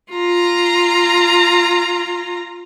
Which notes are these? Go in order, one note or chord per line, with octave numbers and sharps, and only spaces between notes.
F4 A#5